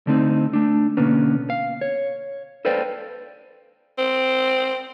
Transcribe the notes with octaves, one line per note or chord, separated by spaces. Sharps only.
D3 A3 C4 D#4
A3 D4
B2 D3 A#3 B3 C#4
F5
C#5
A4 B4 C5 D5 F5 G5
C4